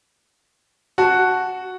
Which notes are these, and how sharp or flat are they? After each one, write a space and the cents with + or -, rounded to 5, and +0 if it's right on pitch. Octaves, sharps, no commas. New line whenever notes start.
F#4 +0 A5 -5